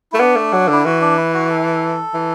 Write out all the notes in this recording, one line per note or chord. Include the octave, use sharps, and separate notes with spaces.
A3 E4
B3 D4
A3
F#3
D3 E4
E3 F#4
D4
E4
F#4
A4
E3